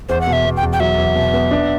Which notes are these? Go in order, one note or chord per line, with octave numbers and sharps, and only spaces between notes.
E2 C5
F#5
B2
E5
B2
G5
E2
G5
F#3 E5
E2
B2
B3
D4